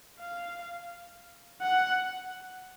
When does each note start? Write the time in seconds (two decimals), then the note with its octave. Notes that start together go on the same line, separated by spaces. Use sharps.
0.20 F5
1.62 F#5